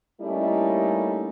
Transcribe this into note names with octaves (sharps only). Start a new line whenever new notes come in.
G3 A3 A#3 C#4 D#4 E4